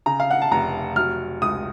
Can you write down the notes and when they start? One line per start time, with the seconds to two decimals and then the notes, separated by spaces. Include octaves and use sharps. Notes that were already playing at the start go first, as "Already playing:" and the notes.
0.06 C#3 A#5
0.20 F5
0.31 F#5
0.42 A5
0.51 F1 A#5
0.96 F#3 F6
1.42 C#2 D#6